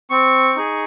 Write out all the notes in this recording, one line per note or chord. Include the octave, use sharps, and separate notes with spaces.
C4 C#6
D#4 G#4